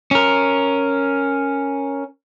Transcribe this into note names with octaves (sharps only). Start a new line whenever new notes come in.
C#4 A#4